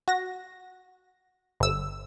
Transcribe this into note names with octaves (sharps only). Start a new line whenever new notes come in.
F#4 A#6
G1 E6